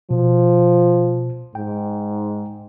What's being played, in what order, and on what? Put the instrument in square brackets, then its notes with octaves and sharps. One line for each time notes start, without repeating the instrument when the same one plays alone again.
[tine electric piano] B2 [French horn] F3
[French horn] G#2 [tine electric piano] G5